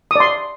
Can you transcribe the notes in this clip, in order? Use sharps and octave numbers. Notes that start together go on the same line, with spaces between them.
D5 C6 D#6